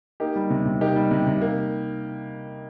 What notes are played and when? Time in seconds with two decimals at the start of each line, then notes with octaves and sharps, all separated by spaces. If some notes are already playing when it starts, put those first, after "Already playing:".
0.20 A#3 D#4 G4
0.36 G3
0.50 C3
0.65 C3
0.81 A#3 D#4 G4
0.96 G3
1.11 C3
1.27 C3
1.41 A#3